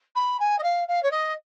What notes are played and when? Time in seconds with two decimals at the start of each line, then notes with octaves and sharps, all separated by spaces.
0.15 B5
0.39 G#5
0.58 D#5
0.63 F5
0.88 F5
1.03 C#5
1.11 D#5